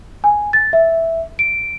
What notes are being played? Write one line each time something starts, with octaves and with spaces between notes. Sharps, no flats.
G#5
A6
E5
D7